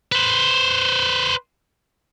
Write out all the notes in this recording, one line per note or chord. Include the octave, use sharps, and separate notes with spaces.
B4 C5